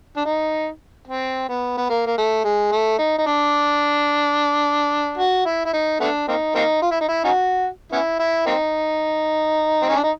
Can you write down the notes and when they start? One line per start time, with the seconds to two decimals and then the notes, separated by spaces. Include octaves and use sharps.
0.17 D4
0.25 D#4
1.07 C4
1.49 B3
1.77 B3
1.89 A#3
2.06 A#3
2.18 A3
2.44 G#3
2.72 A3
2.98 D#4
3.18 D#4
3.26 D4
5.18 F#4
5.45 E4
5.66 E4
5.73 D#4
6.01 A3 B3 D4
6.28 A#3 C4 D#4
6.55 A#3 C4 D#4
6.82 F4
6.91 E4
7.01 D#4
7.08 E4
7.24 C#4 D#4 F#4
7.92 B3 C#4 E4
8.19 E4
8.46 A#3 C4 D#4
9.82 C4
9.89 C#4
9.96 D4
10.03 D#4